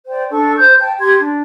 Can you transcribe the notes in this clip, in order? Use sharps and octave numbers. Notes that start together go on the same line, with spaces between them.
C5 D5 G5
D4 A4 C#6
C5 G6
G5 A5
G4 C6 G#6
D4